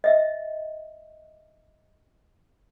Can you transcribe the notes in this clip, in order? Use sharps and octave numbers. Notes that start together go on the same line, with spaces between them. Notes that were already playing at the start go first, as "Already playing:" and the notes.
D#5 E5